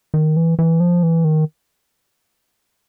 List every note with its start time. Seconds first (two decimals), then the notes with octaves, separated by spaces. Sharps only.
0.14 D#3
0.37 E3
0.59 E3
0.80 F3
1.03 E3
1.25 D#3